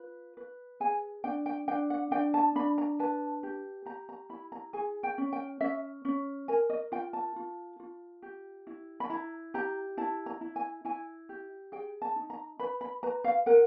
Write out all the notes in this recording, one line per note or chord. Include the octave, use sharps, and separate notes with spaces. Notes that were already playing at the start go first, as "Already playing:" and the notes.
Already playing: F4 B4
B4
G#4 G#5
D4 G5
G5
D4 G5
F#5
D4 G5
A5
D4 B5
A#5
B4 A5
G4
G4 A#5
A#5
E4 B5
A#5
G#4 G#5
G5
C#4
G5
C#4 E5
C#4
A#4 G#5
D#5
F4 G5
A5
F4
F4
G4
E4
B5
E4 A#5
G4 A#5
E4 A5
A#5
E4
G#5
E4 G#5
G4
G#4 G5
A5
D#4
A#5
B4 B5
B5
B4 A#5
F5
A#4 F#5